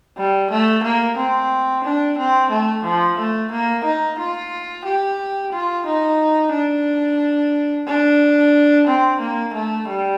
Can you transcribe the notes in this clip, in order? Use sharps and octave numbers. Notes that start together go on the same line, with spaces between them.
G3
A3
A#3
C4
D4
C4
A3
F3
A3
A#3
D#4
F4
G4
F4
D#4
D4
D4
C4
A#3
A3
G3